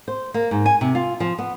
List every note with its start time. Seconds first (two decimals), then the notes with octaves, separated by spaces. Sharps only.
0.08 C5
0.34 A#3
0.51 G#2
0.66 G#5
0.81 C3
0.95 F4
1.20 F3
1.38 B3